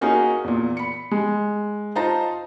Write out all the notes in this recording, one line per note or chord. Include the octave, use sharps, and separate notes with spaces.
A#3 C#4 D#4 F#4 G#4 A#4
E2 A#2
B5 C#7
G#3
D#4 F4 C5 A5 A#5